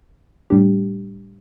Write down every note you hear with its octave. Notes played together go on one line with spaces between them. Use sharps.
A2 G3 D4 G4